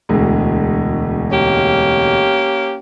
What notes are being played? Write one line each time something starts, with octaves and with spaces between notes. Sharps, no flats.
E1 D2 G#3
A#3 C#4 G4